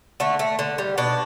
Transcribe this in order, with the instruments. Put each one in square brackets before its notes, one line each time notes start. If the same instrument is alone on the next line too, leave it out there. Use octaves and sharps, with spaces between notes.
[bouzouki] D3 A3
A3
D3
G3
B2 D4